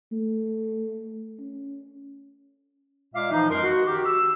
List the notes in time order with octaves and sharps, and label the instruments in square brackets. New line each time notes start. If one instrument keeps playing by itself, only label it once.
[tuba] A3
C#4
[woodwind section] A#2 G#3 E5 F5 D6
E3 F3 D#4
F#2 G#3 A#4 C6
F#4
D#3 G4
E6